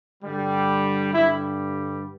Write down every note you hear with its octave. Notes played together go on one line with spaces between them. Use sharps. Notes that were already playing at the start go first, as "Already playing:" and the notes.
G2 D3 G3
G2 D3 G3 E4